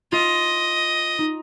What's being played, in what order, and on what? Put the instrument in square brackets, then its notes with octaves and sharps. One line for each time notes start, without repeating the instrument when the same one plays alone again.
[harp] F4 [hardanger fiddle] D#5
[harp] D#4